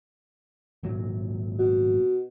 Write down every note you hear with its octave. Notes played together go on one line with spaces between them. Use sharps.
G#1 A#2 F#3
B2